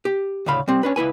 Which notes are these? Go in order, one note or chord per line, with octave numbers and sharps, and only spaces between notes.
G4
D2 A2 C#3 F5 B5
G3 C4
C#4 D4 B4
C#2 E4 B4 G#5